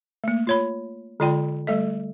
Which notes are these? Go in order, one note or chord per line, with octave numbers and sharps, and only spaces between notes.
A3 A#3
F4 C#5 B5
D3 G#3 F4 D5 G5 B5
G3 A3 A4 D#5